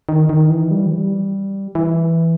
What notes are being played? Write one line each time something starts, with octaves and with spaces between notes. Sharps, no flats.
D#3
D#3
E3
G3
E3
G3
E3